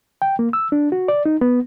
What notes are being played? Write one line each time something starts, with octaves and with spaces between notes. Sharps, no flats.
G5
A#3
E6
D4
F#4
D5
D#4
B3